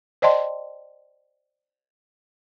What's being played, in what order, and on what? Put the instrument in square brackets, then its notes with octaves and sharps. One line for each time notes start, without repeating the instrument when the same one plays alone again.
[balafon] C5 D5 D#5 G5 A5 C6